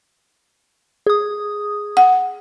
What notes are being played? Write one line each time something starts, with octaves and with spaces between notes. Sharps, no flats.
G#4 D#6
F#5